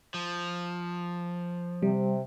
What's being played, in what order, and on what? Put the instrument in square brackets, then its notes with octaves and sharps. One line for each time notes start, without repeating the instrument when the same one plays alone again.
[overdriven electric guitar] F3
[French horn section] C3 [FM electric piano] G3